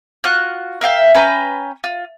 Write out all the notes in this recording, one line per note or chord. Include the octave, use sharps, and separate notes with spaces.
F4 F#4 F6 F#6
A#4 E5 F5 G5
C#4 B4 G5 A#5
F4